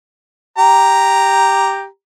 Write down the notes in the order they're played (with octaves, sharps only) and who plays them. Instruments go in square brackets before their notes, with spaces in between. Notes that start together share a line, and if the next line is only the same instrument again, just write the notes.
[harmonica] G4 A#5